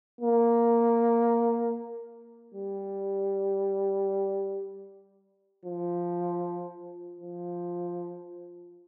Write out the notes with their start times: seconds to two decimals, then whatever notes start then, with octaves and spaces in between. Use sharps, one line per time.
0.21 A#3
2.54 G3
5.65 F3
7.21 F3